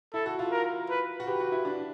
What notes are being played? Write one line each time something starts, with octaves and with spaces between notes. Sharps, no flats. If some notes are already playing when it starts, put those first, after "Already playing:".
E4 A4
F#4
F4
A#4
B4
F#4
G4 B4
F#4
E4
D4